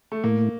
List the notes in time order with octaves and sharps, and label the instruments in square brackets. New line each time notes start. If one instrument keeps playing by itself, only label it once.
[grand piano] A3
[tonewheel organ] A2 [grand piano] A#3